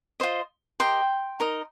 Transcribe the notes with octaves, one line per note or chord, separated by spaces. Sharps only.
F4 C5 D#5
G4 A#4 D#5 G5 C6
D#4 A#4 D#5